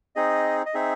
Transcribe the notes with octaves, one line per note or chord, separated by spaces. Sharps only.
C4 D#4 G#4 D#5
D#5
C4 D#4 G#4 E5